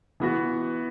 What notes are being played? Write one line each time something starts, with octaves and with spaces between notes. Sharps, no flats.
E3 B3 F#4